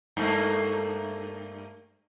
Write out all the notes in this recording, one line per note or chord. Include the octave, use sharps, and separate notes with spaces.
G2 A3 A#3